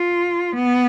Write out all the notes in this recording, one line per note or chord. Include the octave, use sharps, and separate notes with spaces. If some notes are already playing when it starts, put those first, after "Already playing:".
Already playing: F4
B3